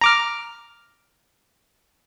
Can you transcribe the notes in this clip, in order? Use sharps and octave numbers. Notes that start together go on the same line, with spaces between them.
A#5 D6 F6